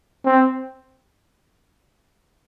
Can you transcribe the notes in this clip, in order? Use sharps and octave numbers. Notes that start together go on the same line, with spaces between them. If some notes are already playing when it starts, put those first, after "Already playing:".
C4